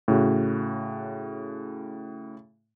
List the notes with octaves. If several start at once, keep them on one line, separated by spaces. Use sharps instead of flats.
A2 C#3 F#4